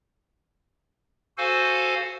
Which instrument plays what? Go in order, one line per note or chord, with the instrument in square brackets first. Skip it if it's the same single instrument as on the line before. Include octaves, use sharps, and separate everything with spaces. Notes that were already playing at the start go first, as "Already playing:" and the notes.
[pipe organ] F#4 A4 C5 F5 G#5